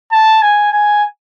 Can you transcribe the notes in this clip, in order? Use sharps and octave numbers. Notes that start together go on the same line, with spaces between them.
A5
G#5
G#5